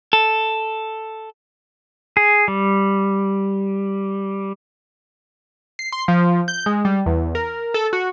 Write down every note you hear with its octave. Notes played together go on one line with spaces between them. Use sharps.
A4
G#4
G3
C7
C6
F3
G6
G#3
G3
E2
A#4
A4
F#4